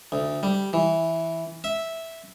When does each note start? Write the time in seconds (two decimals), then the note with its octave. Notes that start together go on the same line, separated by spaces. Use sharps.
0.12 D2
0.43 G3
0.73 E3
1.64 E5